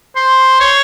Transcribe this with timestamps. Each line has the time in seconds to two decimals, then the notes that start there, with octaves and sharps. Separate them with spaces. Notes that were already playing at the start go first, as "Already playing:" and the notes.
0.16 C5
0.60 C#5